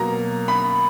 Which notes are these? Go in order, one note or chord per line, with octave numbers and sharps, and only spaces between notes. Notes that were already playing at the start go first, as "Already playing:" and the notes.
Already playing: B2 F#3 A#3 A#5
B5